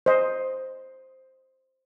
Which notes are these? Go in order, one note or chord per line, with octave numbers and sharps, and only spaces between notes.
C5 D#5